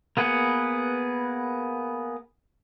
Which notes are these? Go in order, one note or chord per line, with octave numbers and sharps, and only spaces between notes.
A#3 B3 G#4 B4 F#5